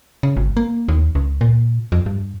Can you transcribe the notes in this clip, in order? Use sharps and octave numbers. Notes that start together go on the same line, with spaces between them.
C#3
G#1
A#3
D#2
C#2
A#2
F2
G2